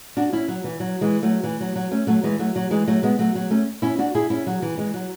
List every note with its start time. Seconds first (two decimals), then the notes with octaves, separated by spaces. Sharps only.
0.17 D4 F#4
0.32 C#4 E4
0.48 F#3
0.64 E3
0.80 F#3
1.01 E3 G#3
1.23 F#3 A3
1.44 E3
1.60 F#3
1.76 F#3
1.91 A3 C#4
2.07 F#3 A3
2.24 E3 G#3
2.39 F#3 A3
2.56 F#3
2.71 E3 G#3
2.87 F#3 A3
3.03 G#3 B3
3.19 F#3 A3
3.35 F#3
3.51 A3 C#4
3.82 C#4 E4
3.99 D4 F#4
4.15 E4 G#4
4.30 C#4 E4
4.47 F#3
4.62 E3
4.78 E3 G#3
4.94 F#3